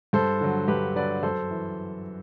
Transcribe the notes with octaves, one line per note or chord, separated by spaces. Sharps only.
G2 A4 C5
D3 F#3
G2 G4 B4
D3 F#3 B4 D5
F#2 A4 C5
E3